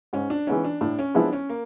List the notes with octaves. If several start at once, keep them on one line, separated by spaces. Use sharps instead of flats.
G#2 C#4
D4
E3 G#3 B3 C#4 D#4
D4
A2 D4
C#4
F3 G#3 B3 D4 E4
C#4
A#3